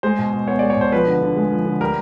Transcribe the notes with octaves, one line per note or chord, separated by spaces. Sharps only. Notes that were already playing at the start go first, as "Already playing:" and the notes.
G#3 C5
B2
B2
B3 C#5
G#3 D5
C#5
B2 C5
F3 B4
D3
D3
G#3
F3
D3
G3 A#4